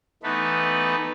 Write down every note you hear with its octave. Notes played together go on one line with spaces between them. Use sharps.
E3 A3 B3 D#4 B4